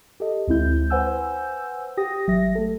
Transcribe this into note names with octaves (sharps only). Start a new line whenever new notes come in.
G4 A4 D#5
D2 G#3 C4 E4 G6
B4 C5 F#5 G#5 E6 G6
G4 G5 D#6 A#6
G#1 F#3 E5 A#6
A3 A4